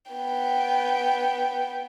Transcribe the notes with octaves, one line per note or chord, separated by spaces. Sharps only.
B3 G5